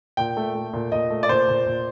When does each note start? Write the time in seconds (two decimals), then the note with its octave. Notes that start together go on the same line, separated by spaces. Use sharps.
0.17 A#2 G5
0.37 A3
0.55 A3
0.73 A#2
0.92 A#2 D#5
1.10 A3
1.23 D5
1.29 A#2 C5
1.48 A#2
1.66 A#2